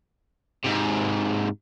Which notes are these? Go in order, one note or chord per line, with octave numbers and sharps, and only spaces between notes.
G#2 C3